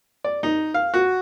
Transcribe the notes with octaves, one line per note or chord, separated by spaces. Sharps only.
D5
D#4
F5
F#4